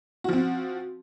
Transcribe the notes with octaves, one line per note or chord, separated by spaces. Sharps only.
F3 C4 F#4